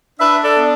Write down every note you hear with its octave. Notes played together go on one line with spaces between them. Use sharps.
D4 B4 E5
A4 D5
B3